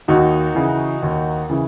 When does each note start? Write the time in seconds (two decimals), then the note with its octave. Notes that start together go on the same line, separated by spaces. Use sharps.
0.08 D#2 D#4 F#4
0.55 C#3 E3
1.03 D#2
1.50 C#3 E3